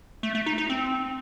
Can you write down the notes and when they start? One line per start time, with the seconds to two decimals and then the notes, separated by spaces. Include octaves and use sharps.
0.23 A3
0.35 A3
0.46 D#4
0.58 D#4
0.70 C4